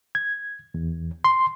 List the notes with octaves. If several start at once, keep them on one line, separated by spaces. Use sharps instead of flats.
G#6
E2
C6